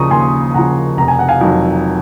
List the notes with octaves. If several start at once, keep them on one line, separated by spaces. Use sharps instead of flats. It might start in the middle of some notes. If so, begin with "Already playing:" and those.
Already playing: D#2 C#3 F3 A#5 C#6 D#6
D#2 G#5 C6
C#3 F3 F#5 A#5
F1 A#5
G#5
F#5
F5 G#5
F2 D#3 F#3